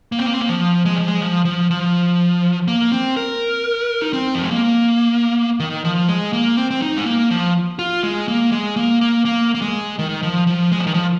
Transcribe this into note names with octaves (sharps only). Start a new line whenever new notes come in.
A#3
C4
A#3
C4
A#3
F3
G#3
F3
G#3
F3
F3
F3
A#3
C4
A#4
D#4
C4
F3
G#3
A#3
D#3
F3
G#3
A#3
C4
C4
D#4
G#3
A#3
F3
F4
G#3
A#3
G#3
A#3
A#3
A#3
A#3
G#3
D#3
F3
F3
G#3
F3
D#3
F3